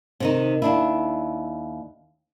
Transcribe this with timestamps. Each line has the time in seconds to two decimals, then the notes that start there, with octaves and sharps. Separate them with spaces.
0.20 C3 D#3 D#4
0.62 D#2 D4 E4